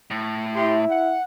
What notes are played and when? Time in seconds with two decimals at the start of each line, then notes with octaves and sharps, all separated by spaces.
0.11 A2
0.55 E4 G4 C6
0.89 F#5